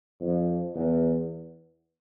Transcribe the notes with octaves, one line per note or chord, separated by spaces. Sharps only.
F2
E2